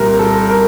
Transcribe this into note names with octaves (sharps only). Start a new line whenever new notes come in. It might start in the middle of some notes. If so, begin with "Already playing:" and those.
Already playing: C2 A#2 G3 C4 A#4
A4
A#4